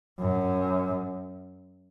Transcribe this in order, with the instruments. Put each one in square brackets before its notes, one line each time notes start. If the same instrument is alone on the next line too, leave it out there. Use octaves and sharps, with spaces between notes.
[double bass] F#2